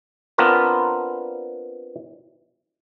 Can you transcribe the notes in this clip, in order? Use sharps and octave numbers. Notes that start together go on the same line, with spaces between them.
B3 C4 D4 F4 A#4 B4